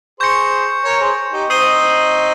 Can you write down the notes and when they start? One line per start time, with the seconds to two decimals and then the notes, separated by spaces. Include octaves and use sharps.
0.20 G#4 C5 C#6 G6 A#6 C#7
0.84 A#4 C#5
1.01 G#4 C5
1.33 D#4 G4
1.50 C4 D#4 D#6 G6 C7 D#7 G7